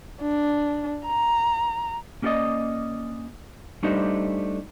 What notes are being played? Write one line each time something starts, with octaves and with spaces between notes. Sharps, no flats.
D4
A#5
A#3 C#4 G4 A4 D5 D#5
G3 A3 D4 D#4 G4 C5